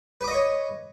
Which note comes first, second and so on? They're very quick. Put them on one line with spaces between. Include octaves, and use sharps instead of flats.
B4 D6 D#5 C#6 C#5